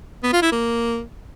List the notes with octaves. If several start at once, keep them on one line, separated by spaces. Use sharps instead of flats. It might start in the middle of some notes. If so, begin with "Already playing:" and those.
B3
F4
E4
A#3